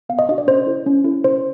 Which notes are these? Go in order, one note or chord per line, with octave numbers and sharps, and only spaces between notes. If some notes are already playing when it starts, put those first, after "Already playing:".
B3 F5
D#5
D4 F#4 D#5
D5
C#4 C5
E4 A4
C#4
E4 A4
C#4 C5